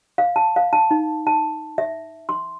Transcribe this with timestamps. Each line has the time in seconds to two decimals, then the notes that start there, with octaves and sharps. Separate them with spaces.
0.18 F5
0.36 A5
0.56 F5
0.73 A5
0.91 D#4
1.27 A5
1.78 E5
2.29 C6